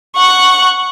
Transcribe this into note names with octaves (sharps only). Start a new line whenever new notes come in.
F#5 C#6